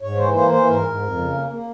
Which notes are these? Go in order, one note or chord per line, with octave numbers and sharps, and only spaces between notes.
G#2 C#5
E3 C5
A#3 C5
E3 C5
G#2 A#4
G#2
F2
C#3
A#3
A#3